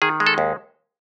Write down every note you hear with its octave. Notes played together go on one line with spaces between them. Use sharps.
D#3 G#4
G#3
A4
D#2